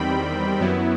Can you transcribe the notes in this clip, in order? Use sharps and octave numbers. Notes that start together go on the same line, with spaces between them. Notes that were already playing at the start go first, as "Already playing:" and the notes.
Already playing: E2 D#3 G3 C4 G5 B5
F#2 F#3 B3 E4